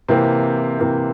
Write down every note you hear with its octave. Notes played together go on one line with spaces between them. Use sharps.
C3 E3 A#3 C4
C3 E3 A#3